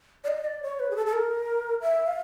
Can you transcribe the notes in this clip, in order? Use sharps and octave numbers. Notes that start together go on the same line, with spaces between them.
D5
D#5
D5
C#5
B4
G#4
A4
A4
A#4
E5
F5